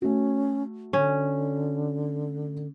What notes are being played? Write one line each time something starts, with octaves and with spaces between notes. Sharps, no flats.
A3 C#4 F#4
D3 C#4